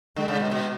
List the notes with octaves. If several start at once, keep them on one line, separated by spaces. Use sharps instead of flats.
D3 G#3
C#3
B2
B2